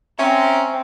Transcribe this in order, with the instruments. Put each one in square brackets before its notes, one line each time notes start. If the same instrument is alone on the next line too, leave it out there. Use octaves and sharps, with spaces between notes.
[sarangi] C4 [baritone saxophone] C#4 [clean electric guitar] E5 [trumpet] A#5